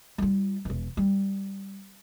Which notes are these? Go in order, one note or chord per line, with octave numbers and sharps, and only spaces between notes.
G3 F4
E1 E3
G3